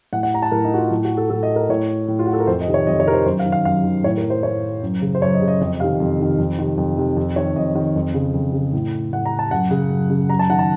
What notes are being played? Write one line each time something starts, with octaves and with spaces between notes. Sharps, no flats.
A2 F#5
F#5
A#5
A5
A2 A#4
D#4
F#4
F4
A2
F#4
A4
A2 A4
D#5
A#4
A2 C#5
A2
F4
F#4
A4
A#4
F2 C5
D#5
C3 D#3
C#5
F2 D#5
C#5
C3 D#3 A#4 C5
F#2 C5
F5
D#3
F5
F#2 F5
D#3
A2 C#5
A#4
C5
A2 C#5
F#2
C#3
C5
F#2 C#5
D#5
C#3
D#5
F2 D#5
C3 D#3 F5
F2
C3 D#3
F2
C3 D#3
F2
C3 D#3
F2
D#3 C#5
F2 D#5
D#3
F2
C#3
F2
C#3
A2
A2 F#5
A#5
A5
F#2 F#5
C#3
F#2
C#3
F#2 A#5
A5
D#3 F#5
A5